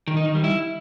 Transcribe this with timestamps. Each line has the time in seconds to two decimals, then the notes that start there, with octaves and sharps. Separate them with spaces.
0.08 D#3
0.17 D#4
0.26 D#3
0.35 G3
0.44 E4